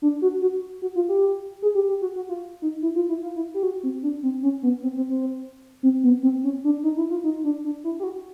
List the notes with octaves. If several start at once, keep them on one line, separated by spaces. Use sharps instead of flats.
D4
F#4
F#4
F#4
F4
G4
G#4
G4
G4
F#4
F#4
F4
D#4
E4
F4
E4
F4
E4
G4
F#4
C4
D4
C4
C#4
B3
C4
C4
C4
C4
B3
C4
C#4
D4
D#4
E4
F4
D#4
D4
D4
E4
G4
F#4